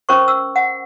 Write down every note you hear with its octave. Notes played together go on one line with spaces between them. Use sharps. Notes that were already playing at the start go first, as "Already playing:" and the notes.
C#4 A#4 C5 C#6
E6
F#5